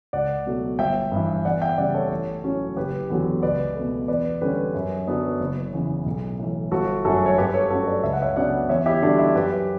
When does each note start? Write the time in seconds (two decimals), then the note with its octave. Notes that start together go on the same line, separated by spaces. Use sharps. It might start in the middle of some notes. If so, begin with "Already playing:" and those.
0.13 C#2 D5 F#5
0.46 B2 F#3 A3
0.79 G1 E5 G5
1.12 G2 E3
1.45 E2 D5 F#5
1.61 E5 G5
1.78 C#3 G3 D5 F#5
1.94 A4 C#5
2.11 A1
2.44 A2 F#3 C#4
2.77 F#1 G4 B4
3.10 E2 D3 F#3
3.43 C#2 B4 D5
3.75 B2 A3
4.08 E2 B4 D5
4.41 D3 G3 C#4 G4 B4
4.74 F#2
5.07 D3 F#3 B3 D4
5.40 F#1
5.73 E2 C#3 E3
6.06 B1
6.39 A2 E3
6.71 G1 F#4 A4
7.05 F#2 D3 A3 F#4 A4
7.26 C#5
7.38 G2 G4 B4
7.54 A4 C#5
7.70 F#3 A3 C#4 F#4 A4
7.87 B4 D5
8.03 C#2 E5
8.13 F#5
8.22 C#5 E5
8.36 C#3 F#3 B3 D4 D5 F#5
8.69 E2 C#5 E5
8.86 E4 G4
9.02 D3 D4 F#4
9.06 G3
9.19 E4
9.35 F#2 G4 B4